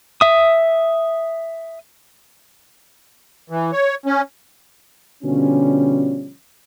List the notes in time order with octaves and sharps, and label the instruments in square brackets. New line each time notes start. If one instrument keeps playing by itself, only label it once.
[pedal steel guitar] E5 D#6
[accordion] E3
C#5
C#4
[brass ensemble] B2 D3 F3 G3 C#4